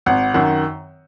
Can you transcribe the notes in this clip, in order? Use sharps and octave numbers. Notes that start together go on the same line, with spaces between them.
G#1 F#5
F#2 D#3 F#5